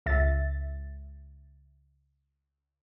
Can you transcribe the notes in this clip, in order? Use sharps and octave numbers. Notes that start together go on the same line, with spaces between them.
C#2 E5 A6